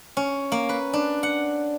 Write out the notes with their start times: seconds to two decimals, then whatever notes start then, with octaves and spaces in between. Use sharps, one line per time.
0.17 C#4
0.52 A#3
0.69 B4
0.93 D4
1.23 F#5